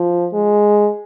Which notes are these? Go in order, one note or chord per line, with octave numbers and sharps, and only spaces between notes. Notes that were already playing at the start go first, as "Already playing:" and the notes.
Already playing: F3
G#3